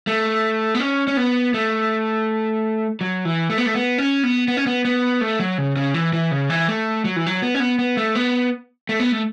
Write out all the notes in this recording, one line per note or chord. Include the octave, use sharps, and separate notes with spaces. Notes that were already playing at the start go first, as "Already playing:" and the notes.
A3
B3
C#4
C#4
B3
A3
F#3
E3
A3
B3
A3
B3
C#4
B3
B3
C#4
B3
B3
A3
F#3
C#3
C#3
E3
E3
C#3
E3
A3
F#3
E3
F#3
B3
C#4
B3
B3
A3
B3
A3
B3
A3